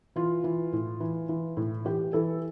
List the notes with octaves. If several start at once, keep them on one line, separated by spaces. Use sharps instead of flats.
E3 F4
E3
A2
E3
E3
A2
E3 G4
E3 A4